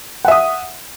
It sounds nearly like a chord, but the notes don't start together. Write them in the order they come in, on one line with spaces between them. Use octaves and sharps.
F#5 E5 D#6